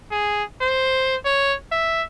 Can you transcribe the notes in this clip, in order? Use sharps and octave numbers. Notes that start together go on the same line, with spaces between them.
G#4
C5
C#5
E5